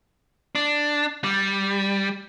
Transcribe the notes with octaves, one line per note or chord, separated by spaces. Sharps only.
D4
G3